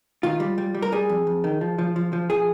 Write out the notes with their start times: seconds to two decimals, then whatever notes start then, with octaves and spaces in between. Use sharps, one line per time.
0.23 D#3 F4
0.40 G3
0.58 G3
0.75 G3
0.82 A#4
0.92 G3 G#4
1.09 F2
1.27 F2
1.44 D#3
1.61 F3
1.78 F3
1.96 F3
2.13 F3
2.30 F3 G#4